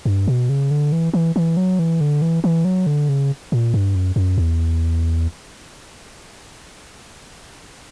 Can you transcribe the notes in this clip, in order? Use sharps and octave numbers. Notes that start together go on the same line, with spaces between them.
G2
B2
C#3
D3
E3
E3
E3
F#3
E3
D3
E3
E3
F#3
D3
C#3
A#2
G2
F#2
F#2
E2